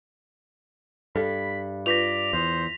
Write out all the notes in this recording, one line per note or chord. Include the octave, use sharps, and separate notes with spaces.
G2 A4 B5
F4 B4 D5 A#6 B6 F7
E2 C5